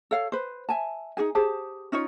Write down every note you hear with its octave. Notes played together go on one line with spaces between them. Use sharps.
A4 C#5 F5
B4 C5
E5 G#5 A5
D#4 F#4 G#4 G#5
G4 G#4 C5 A5
C#4 D#4 F4 C#5